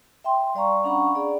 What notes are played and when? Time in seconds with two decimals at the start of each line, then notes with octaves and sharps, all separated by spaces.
0.24 E5 G5 C6
0.55 G3 D5 F5 A#5 C#6
0.84 C#4 D4 F#5 A#5 B5 C#6
1.15 G#4 D5